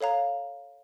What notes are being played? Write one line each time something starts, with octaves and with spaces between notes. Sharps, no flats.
A4 C#5 F5 A#5